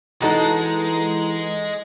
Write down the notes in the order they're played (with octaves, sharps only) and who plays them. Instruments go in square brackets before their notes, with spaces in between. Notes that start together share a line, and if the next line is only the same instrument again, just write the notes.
[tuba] E3 [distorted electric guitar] G#3 [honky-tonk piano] D#4 [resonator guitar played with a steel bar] F#4 A4